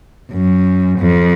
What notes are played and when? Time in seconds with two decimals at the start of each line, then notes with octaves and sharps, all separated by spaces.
0.32 F#2
0.99 F2